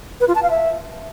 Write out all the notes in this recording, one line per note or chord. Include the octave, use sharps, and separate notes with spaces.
B4
F4
A5
F5
E5